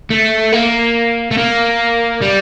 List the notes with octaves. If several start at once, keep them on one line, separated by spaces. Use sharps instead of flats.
A3
A#3
A3
A#3
G3